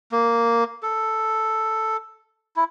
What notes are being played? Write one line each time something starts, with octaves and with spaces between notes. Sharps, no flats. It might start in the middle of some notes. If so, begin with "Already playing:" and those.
A#3
A4
E4